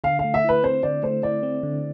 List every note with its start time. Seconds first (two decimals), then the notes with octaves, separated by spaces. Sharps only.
0.04 D3 F5
0.19 F5
0.24 A3
0.34 E5
0.44 E4 B4
0.63 C4 C5
0.83 D3 D5
1.03 A3 C5
1.23 E4 D5
1.43 C4
1.63 D3